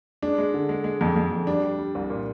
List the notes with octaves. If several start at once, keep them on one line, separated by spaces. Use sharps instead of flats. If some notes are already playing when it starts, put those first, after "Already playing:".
G#3 D4
G#3
D3
G#3
G#3
F2
F2
F2
G3 D4
G3
G3
C2
A#2